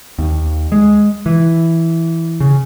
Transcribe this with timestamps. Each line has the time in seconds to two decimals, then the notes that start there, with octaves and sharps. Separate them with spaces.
0.19 D#2
0.72 G#3
1.26 E3
2.40 C#3